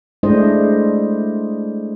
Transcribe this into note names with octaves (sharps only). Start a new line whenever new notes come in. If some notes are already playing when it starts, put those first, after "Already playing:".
G#3 A3 D4 E4 C5 D#5